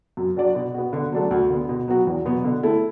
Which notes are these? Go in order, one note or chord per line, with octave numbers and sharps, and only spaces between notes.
F#2
F#3 D4 F#4 D5
B2
B3 F#4
D3
F#3 A3 D4 A4
D2
D3 B3
B2
F#3 B3 F#4
E2
B2 F#3 B3
D3
A3 E4 A4